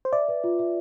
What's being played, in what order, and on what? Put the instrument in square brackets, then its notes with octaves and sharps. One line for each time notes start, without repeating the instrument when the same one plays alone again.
[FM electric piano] C5
[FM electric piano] D5 [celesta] E5
[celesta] B4
F4
E5